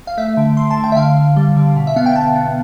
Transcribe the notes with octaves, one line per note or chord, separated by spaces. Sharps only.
F5
A3 E5
D3
D3 C6
A5
D3
G5
E5
D3 F5
D3
G3
D3
B2
E5
B3 F5
G5
B2 A5
B3